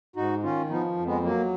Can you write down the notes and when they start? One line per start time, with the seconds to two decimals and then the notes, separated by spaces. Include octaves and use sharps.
0.16 G#2 D#4 F#4
0.43 D#3 C#4 F4
0.70 F3 B3 D#4
0.96 F2
1.05 G#3 B3
1.23 F#3 A#3